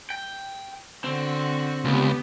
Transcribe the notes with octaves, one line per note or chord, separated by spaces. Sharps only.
G5
D3 C4 F#4
C#2 B3 G4